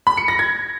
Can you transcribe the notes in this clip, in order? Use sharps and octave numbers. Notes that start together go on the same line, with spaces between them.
B5
C#7
A#6
G#6